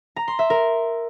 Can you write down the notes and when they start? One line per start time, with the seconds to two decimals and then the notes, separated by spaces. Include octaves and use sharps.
0.16 A#5
0.28 C6
0.39 E5
0.50 A#4